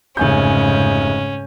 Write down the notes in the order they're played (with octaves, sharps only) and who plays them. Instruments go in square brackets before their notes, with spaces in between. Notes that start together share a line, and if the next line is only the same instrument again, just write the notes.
[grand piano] F1 G#5 G6 [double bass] G#2 C#3 [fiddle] C#4